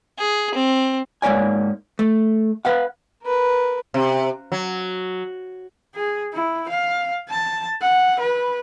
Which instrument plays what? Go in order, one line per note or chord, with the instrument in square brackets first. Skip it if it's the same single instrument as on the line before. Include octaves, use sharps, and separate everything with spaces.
[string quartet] G#4
C4
[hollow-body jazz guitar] G#2 A#3 C#5 D5 G#5
A3
B4 F5 F#5
[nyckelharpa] A#4 B4
[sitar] C3
F#3
[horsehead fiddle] G#4
E4
F5
A5
F#5
B4